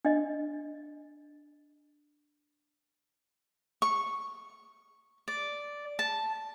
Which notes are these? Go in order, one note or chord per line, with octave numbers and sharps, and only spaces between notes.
D4 D#5
C#6
D5
A5